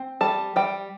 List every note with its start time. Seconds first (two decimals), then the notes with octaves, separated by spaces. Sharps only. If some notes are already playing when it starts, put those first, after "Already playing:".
Already playing: C4
0.21 G3 A5
0.56 G3 G5